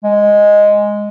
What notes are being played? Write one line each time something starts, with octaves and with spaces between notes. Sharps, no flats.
G#3